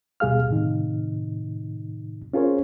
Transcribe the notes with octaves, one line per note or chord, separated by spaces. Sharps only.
D2 B2 G3 G#4 F5 F6
F#2 A2 C3 D#3 D#4
C#4 F4 G#4 A#4 C5 C#5